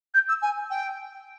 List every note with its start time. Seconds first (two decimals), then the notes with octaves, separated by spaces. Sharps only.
0.14 G6
0.29 E6
0.42 G#5
0.70 G5